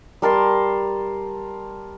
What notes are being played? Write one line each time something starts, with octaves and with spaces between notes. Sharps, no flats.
G3 A#4 A5 C6